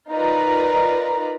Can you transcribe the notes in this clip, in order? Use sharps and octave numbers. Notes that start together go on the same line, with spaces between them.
D#4 F4 A#4 B4 D5 A#5